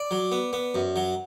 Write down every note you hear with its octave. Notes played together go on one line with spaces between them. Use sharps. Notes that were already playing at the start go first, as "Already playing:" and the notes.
Already playing: D5
F#3
B3
B3
F#2
F#3